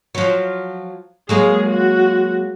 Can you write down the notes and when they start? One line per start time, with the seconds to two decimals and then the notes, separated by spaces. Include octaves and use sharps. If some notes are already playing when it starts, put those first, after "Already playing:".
0.15 F3 F#3
1.29 F#3 G#3 A#3 G#4
1.66 F#4